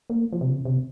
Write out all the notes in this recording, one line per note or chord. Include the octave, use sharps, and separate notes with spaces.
A#3
F3
C3
C#3
C3